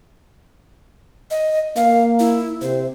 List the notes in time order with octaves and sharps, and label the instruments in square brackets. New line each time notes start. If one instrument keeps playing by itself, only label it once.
[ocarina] D#5
[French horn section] A#3 [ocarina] F5
[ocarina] E4
[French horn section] C3 [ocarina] C5